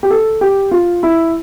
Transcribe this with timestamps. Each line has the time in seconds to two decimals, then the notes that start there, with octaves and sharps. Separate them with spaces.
0.03 G4
0.10 A4
0.41 G4
0.71 F4
1.03 E4